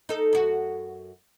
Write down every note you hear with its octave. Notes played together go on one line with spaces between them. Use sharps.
D#4 A4
F#2 F#4